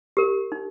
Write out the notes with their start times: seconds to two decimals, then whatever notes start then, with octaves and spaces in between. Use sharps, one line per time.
0.17 G4 A#4
0.52 D#4